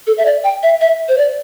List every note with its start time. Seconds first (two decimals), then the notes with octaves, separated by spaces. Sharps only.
0.07 A4
0.18 E5
0.25 D5
0.44 G5
0.63 E5
0.81 E5
1.09 C5
1.18 D5